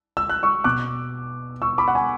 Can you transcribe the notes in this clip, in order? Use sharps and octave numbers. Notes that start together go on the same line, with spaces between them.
E6
F#6
C#6 E6
B2 D6 F#6
C#6 E6
B5 D6
F#5
G#5